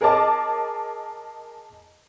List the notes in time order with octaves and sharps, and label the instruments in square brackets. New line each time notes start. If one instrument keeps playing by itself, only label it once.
[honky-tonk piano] G#4 A#4 C#5 D#5 A5 D6